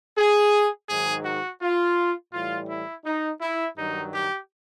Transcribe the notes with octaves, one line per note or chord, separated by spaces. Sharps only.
G#4
G#2 D#3 F#3 G#4
F#4
F4
A2 E3 G3 F4
E4
D#4
E4
G2 D#3 F#3 D#4
G4